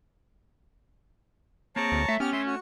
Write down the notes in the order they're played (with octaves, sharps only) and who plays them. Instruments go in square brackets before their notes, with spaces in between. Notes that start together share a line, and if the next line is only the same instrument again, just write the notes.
[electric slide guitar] A#3 C4 G#4 [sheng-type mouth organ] C#5 A5 A#5
[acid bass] D2
[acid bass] A3 [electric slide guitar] E5
[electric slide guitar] B3 [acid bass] C#4 [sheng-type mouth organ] G4 F6
[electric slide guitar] A3 [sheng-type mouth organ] E5 C6
[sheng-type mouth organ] F#4